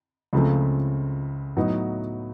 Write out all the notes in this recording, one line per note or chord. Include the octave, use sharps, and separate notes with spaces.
C#2 C#3 F3 A3 C4
A2 F#3 B3 D#4